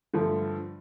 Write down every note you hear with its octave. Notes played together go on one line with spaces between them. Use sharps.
G2 D3 F3 A3